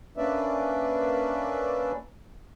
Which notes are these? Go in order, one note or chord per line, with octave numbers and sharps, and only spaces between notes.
A#3 C#4 D4 B4 D5 E5